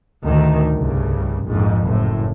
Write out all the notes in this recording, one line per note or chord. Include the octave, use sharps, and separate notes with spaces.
D2 A2 D#3
C2 G2 C#3
A#1 F2 G#2
F#1 A2